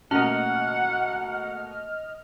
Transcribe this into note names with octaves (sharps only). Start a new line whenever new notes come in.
B2 A3 A#3 C#4 D#5 F#5 F6